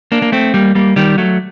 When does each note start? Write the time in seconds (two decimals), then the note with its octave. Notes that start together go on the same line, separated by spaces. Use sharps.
0.12 A#3 D4
0.22 A#3
0.32 A3 C4
0.54 G3 A#3
0.75 G3 A#3
0.96 D#3 G3
1.18 F#3 A3